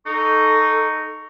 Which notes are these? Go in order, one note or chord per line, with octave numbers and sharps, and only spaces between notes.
D#4 A4 C#6